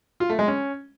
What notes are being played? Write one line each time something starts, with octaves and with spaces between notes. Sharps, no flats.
F4
A3
G#3
C#4